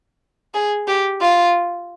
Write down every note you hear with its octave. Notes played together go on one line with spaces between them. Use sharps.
G#4
G4
F4